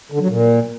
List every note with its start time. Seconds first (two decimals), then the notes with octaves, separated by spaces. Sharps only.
0.12 D3
0.20 F#3
0.29 A#2